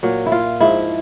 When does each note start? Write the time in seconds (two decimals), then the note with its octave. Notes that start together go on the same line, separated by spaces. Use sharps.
0.03 A#2 F#3
0.26 E4
0.32 F4
0.60 G#2 F3 E4